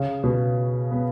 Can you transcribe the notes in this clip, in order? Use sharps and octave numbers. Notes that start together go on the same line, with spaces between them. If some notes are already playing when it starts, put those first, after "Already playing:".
Already playing: C#3
B2
B3